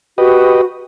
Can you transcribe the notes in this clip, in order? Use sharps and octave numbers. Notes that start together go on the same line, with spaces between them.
F#4 G4 B4 D#5